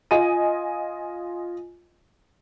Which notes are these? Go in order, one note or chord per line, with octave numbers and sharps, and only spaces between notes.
F4 D#5 G#5 D#7